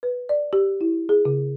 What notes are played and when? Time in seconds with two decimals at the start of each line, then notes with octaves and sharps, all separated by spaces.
0.03 B4
0.29 D5
0.53 G4
0.81 E4
1.09 G#4
1.25 C#3